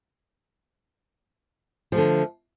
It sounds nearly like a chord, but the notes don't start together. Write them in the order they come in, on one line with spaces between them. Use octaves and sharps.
F3 A3 D3